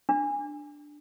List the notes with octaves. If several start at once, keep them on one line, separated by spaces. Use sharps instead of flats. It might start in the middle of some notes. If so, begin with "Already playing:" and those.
D4